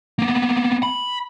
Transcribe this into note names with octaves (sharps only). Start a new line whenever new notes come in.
A#3 B3
B5